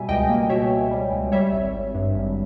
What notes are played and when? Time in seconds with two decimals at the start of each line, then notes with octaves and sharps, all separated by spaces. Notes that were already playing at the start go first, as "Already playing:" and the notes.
Already playing: B2 G3 E5 G#5
0.09 C#2 D#5 G5
0.29 A#3
0.49 B2 C#5 E5
0.71 B2
0.91 G3
1.12 C#2
1.32 G3 C#5 E5
1.52 G#1
1.73 G#1
1.94 G2
2.15 G#1